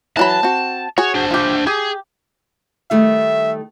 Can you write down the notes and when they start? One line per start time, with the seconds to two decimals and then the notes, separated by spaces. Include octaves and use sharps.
0.17 E3 F#3 A5 B5
0.43 C4 F#4
0.98 F#4 G#4 C#5
1.15 D4 C5
1.31 F4 G4
1.67 G4 G#4
2.91 D#3 G3 A3 E5